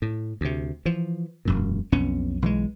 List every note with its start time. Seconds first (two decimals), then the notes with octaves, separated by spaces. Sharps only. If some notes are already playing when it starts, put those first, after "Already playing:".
0.02 A2
0.41 D2 C3
0.86 E3 F3
1.45 E1 F#2 A#2
1.92 B1 F2 B3 C#4
2.42 B1 E3 G3 G#3